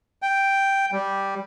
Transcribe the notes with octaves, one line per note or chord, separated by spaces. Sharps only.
G5
G3